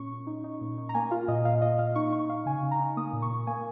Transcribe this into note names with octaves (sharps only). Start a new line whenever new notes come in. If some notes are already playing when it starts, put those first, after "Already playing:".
Already playing: A#2 C#4 C#6
A#2
D#4
D#4
A#2
D#4
A#5
A#3 G#5
F4 F5
A#2 D#5
A#2 F5
A#2 D#5
A#2 F5
D#4 C#6
D#4 C#6
D#4 F5
C#3 G#5
C#3
A#5
D#4
A#3 D#6
A#2
C#6
A#2
A#3 G#5